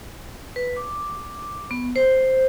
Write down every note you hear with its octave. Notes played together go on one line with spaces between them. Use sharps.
B4
D6
B3
C5